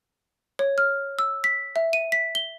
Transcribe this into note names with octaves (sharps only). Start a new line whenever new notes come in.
C#5
F6
E6
B6
E5
D#7
B6
G7